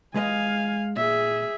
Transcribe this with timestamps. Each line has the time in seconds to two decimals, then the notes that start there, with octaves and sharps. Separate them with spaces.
0.15 G#3 B4 D#5 F5 G#5
0.97 A#2 G#4 E5